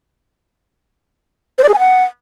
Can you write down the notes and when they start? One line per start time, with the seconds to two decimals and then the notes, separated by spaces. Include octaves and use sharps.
1.58 C5
1.63 D5
1.69 G#4
1.74 G#5
1.79 F#5